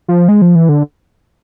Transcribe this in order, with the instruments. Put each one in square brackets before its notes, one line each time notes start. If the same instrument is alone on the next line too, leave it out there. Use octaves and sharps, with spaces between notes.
[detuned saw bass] F3
G#3
F3
E3
D3